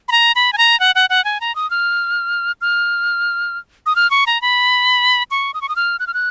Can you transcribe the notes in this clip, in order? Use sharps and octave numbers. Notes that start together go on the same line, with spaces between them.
B5
A#5
B5
G#5
A#5
F#5
F#5
F#5
G#5
A#5
D#6
F6
F6
D#6
F6
C#6
A#5
B5
C#6
D#6
C#6
D#6
F6
F#6
F6
F#6